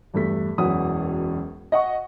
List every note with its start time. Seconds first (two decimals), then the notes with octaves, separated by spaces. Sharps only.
0.14 E2 G2 A3 B6
0.58 E1 F#2 E3 C#4 F#5 D#6
1.72 D#5 F#5 C#6